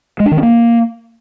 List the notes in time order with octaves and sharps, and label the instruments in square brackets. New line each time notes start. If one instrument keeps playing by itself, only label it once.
[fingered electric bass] G#3
D4
D#3
C#4
A#3